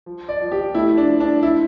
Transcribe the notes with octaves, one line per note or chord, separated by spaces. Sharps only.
F3
D5
F3
G4
A3 E4
D4
F3
D4
E4